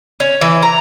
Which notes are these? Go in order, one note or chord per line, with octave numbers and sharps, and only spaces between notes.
C#4
E3
A#5